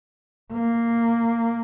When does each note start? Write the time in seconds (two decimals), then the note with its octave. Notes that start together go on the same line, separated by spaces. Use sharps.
0.53 A#3